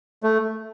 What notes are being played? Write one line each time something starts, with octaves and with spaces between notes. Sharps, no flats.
A3